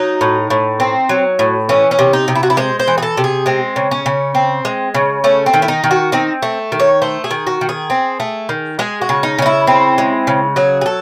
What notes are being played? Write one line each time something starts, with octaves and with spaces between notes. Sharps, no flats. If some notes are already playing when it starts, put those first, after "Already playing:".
Already playing: F#3 D#4
A2
A2
C4
F#3
A2
E3 C#4
C#4
C3
D#4
C3
E4
F#4
E4
G#3 C5
C5
E3
G#4
A4
C3
G#4
G#3 C4
C#3
C#4
C#3
C4
G#3
C#3
A3 C#4
C4
D#3
E4
D#4
D#3
F#4
C4 D#4
A3
D#3
C#5
A3 C5
G#4
D#3
F#4
D#3
G#4
C4
A3
D#3
G#3 G#4
F#4
C#3
D#4
C#3 D#4
E4
C4
G#3
C#3
F#3 G#4
G#4
A4